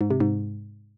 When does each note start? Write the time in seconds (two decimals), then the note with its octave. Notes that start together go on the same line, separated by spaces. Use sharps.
0.01 G#2
0.10 C3
0.20 G#2